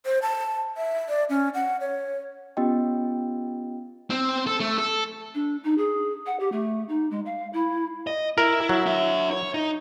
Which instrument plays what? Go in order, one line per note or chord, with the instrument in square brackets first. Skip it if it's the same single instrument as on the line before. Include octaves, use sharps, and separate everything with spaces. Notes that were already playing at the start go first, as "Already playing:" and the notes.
[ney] C5
A5
E5
D5
C#4
F#5
C#5
[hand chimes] B3 C#4 F4 G4 D#5 G5
[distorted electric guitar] C4
A4
A3
A4
[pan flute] D4
D#4
G#4
F#5
G4
A3
D#4
G#3
F5
E4
[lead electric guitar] D#5
[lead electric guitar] E4 [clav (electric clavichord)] A#4
[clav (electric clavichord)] F#3
[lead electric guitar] D4 E5
C#5
D#4